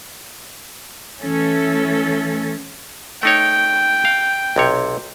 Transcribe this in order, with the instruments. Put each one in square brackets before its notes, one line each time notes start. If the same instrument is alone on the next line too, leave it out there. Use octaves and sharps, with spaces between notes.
[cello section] E3 A3 C#4 A4
[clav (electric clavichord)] A3 D#4 C#5 [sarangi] G5
[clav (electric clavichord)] F5
B1 C3 C#5